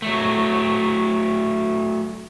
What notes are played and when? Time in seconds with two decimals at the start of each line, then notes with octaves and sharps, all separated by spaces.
0.02 F#3 A3